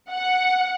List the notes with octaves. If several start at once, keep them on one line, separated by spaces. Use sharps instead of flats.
F#5